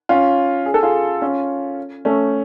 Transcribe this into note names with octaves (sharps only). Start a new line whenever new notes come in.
C#4 F4
G#4
A4
F4 G#4
C#4 F4
A3 C#4